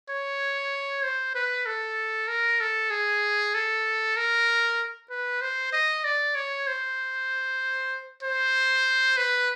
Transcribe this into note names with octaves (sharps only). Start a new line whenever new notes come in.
C#5
C5
B4
A4
A#4
A4
G#4
A4
A#4
B4
C5
D#5
D5
C#5
C5
C5
B4